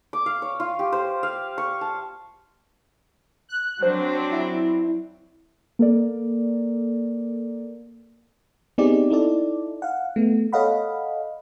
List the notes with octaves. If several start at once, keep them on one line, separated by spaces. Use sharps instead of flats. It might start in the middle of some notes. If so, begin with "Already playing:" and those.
D6
F5
C#5
F4
G4
C5
F5
C#6
A5
F#6
F#3 C4 D4 C5
E4
A#3 A4 A#4 D5
B3 C4 D#4 G4 G#4 D5
D#4 E4 A4 D5
F5 F#5
A3 B3
A4 C#5 D#5 F5 F#5 B5